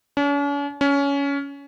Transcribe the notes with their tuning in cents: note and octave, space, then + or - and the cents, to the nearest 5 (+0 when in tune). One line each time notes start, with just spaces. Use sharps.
C#4 +45
C#4 +20